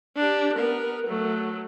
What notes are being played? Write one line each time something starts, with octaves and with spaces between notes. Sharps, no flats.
D4 G4
B3 A#4
F#3 A3